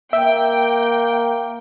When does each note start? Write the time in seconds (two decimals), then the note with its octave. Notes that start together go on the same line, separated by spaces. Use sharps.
0.13 A#3 E5 G5